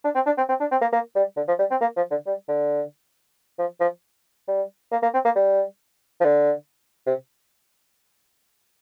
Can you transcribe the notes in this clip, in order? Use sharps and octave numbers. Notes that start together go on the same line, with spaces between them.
D4
C4
D4
C4
C4
D4
C4
A#3
A#3
G3
D3
F3
G3
C4
A#3
F3
D3
G3
D3
F3
F3
G3
A#3
A#3
C4
A#3
G3
F3
D3
C3